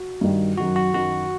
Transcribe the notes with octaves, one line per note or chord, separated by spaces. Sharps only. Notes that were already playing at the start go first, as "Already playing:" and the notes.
Already playing: F#4
G2 D#3 G3
F#2 D#3 F#3 F#4
F#4
F#2 D#3 F#3 F#4